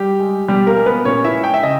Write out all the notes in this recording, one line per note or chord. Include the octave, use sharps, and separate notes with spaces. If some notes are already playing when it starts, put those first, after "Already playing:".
Already playing: G3 G4
G#3
B2 G3 G4
A#3 A#4
G#3
B3 B4
A#2 C#4 C#5
E4 E5
G#3
G5
E5
C#3 D#5